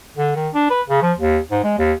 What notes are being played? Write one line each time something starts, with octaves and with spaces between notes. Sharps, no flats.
D3
D#3
D4
B4
C#3
F3
D#2
G#2
G#3
D#2